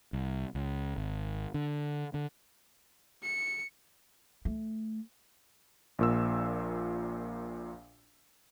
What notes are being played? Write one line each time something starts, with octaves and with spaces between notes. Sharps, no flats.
C2
C#2
G#1
D3
D3
C#7
A3
A#1 A#2 E6